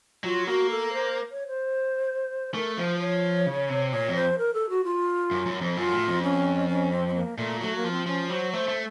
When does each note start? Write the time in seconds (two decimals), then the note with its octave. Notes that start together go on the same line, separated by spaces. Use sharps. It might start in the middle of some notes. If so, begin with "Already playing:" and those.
0.24 F#3 F4
0.47 A#3 F#4
0.70 A4
0.93 C5
1.32 C#5
1.48 C5
2.54 A3 A#4
2.77 F3 C5
3.00 C#5
3.46 C#3
3.69 C3
3.92 A#2 C#5
4.08 F2
4.16 C5
4.38 A#4
4.54 A4
4.70 F#4
4.84 F4
5.31 F#2
5.46 F#2
5.61 F2
5.77 F#2 F4
5.92 A2
6.07 F2
6.23 C#4
6.68 C#4
6.92 C4
7.08 C4
7.15 A#3
7.38 A#2 A3
7.61 F#3 A3
7.76 A#3
7.84 F3
7.91 C4
8.06 F3 C#4
8.30 F#3 C5
8.53 A3 C5
8.68 A3